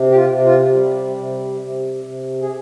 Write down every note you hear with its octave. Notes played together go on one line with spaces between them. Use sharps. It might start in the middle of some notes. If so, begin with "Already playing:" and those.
Already playing: C3
G4
F4
C3
F4
G3
C3
C3
C3
G#4